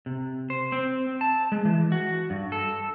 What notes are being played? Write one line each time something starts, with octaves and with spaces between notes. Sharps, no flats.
C3
C5
C4
A5
G#3
E3
F#4
G2
A4